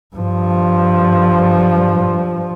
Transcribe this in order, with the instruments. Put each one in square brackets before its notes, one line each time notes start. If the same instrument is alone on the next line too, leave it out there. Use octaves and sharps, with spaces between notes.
[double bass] G2 F3